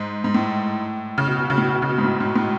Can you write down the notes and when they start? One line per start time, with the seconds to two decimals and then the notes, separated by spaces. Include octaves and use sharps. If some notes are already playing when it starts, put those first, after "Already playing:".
Already playing: G#2
0.24 G#2
0.34 A2
1.18 C#3
1.27 B2
1.39 B2
1.50 C#3
1.58 A2
1.62 B2
1.74 B2
1.82 C#3
1.89 B2
1.98 G#2
2.04 A2
2.20 G#2
2.36 A2